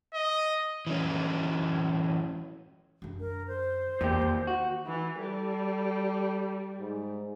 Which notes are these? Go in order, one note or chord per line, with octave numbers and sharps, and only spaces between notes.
D#5
E3 F#3 C#4
F#2 D3
A#4
C5
E2 A#2 A#3 G4
D#3
F#4
E3
G3 A4
G#2